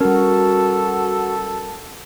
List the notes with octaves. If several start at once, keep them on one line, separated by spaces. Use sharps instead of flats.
G3 C#4 F#4 A4 A#4